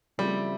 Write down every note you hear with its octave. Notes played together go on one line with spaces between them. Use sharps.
C#3 F3 G3 A3 C4 E4